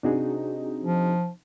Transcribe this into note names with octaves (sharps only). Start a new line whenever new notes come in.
C3 D4 D#4 F#4 G#4
F3